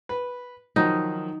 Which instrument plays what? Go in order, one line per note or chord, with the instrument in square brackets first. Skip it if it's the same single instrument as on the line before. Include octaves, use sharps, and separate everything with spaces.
[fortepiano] B4
[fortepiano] D#3 F3 F#3 [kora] D#4